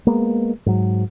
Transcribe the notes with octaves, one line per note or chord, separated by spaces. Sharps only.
G#3 A#3 B3
G#2 F#3